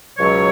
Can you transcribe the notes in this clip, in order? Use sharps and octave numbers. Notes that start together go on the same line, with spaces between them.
C#2 B2 F#3 C#5